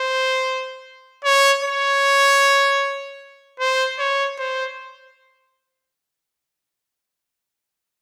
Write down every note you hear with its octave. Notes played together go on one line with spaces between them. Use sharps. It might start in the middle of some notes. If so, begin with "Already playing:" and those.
Already playing: C5
C#5
C#5
C5
C#5
C5